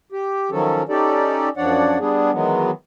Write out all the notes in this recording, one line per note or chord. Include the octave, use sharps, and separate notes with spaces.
G4
D#3 F3 F#3 C#4 A4
C#4 D#4 G4 A4 D5
F#2 F3 D4 C#5 D5 F#5
G3 B3 D4 G#4
D#3 E3 F#3 G#3 B3